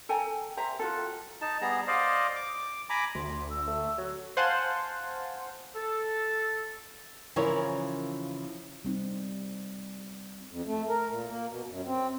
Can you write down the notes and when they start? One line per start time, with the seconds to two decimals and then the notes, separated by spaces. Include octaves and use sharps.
0.09 A4 G5 G#5 A#5
0.57 G4 C5 E5 A#5
0.79 F4 F#4 A4
1.42 D#4 A5
1.61 G3 B3 G#4 A#5
1.87 C5 D5 D#5 F5
2.36 D6
2.90 G#5 A#5 B5 D6
3.15 D2 C6
3.50 E6
3.67 A3
3.98 F#3
4.37 C5 F5 F#5 G#5 A5 C6
5.76 A4
7.36 C#3 E3 F3 E4 A#4 C#5
8.85 G3 C4 D#4
10.51 F2
10.66 A3
10.89 A#4
11.10 A#2
11.29 A#3
11.48 B2
11.67 F#2
11.86 C4